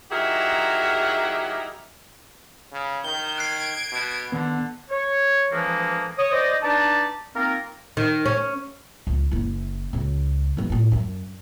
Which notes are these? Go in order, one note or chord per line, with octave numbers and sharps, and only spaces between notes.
F#3 D#4 E4 G4 G#4 A#4
C#3
D#3 G6 G7
F#6 G#6 C7 D7
B2
D3 D#3 B3
C#5
D2 E3 F3 G#3 A#3 B3
C#5 D#6
C5 D5 D#5
D4 D#4 B4 D5 A5
A#3 C4 D#4 F4 A#4
D#3
C#4
C#2
F#1 E4
C#2 C#3
E2 G2
A2 F3
F#2